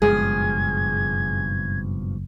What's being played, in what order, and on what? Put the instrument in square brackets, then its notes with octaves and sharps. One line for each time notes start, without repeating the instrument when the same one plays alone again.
[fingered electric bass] F#1 G#3 [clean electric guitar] G2 B2 F3 [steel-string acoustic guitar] G#4 [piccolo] G#6